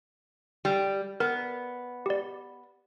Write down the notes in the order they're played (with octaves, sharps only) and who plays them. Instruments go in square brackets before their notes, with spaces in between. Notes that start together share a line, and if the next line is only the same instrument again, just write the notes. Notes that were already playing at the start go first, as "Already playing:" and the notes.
[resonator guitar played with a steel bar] G3
[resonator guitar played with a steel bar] B3 [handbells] A#4
[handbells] G4 D5